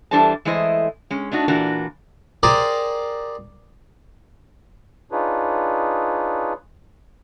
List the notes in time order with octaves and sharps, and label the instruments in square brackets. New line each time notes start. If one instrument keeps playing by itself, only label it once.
[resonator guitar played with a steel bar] E3 G3 D4 A4 C5 A5
E3 G#3 A3 E4 C5 D#5
G#3 C#4
A3 D4 D#4 F#4
A#2 E3 D4 F4 F#4 A#4
[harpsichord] G4 G#4 A#4 C5 D5
[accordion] D4 D#4 F4 G#4 B4 C#5